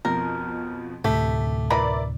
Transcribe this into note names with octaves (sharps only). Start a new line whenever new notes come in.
F2 B2 F3 A#4
D2 A2 C3 A3 G4 B6
E4 A#4 B4 D5 B5